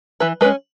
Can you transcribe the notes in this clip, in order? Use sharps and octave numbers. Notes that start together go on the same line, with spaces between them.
E3 B4
G#3 C#4 B4